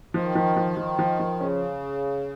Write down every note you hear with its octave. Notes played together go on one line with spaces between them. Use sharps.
D#3 F3
F3
F3
F3
F3
F3
C#3 C#4